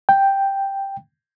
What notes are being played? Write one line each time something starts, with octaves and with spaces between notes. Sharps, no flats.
G5